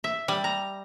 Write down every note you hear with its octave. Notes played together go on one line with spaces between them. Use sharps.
E5
G3
A#5